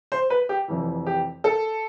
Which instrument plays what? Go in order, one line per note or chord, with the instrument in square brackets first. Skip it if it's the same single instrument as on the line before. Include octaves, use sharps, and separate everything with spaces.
[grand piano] C5
B4
G4
F1 F2 E3
G4
A4